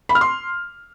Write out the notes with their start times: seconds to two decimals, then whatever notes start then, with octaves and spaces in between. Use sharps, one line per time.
0.09 B5
0.15 F6
0.21 C6